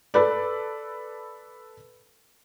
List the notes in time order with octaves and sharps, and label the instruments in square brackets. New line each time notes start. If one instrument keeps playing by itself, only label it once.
[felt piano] A4 B4 D5